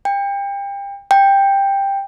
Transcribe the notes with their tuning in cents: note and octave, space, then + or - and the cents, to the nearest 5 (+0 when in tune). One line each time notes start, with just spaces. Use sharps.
G5 +30
G5 +10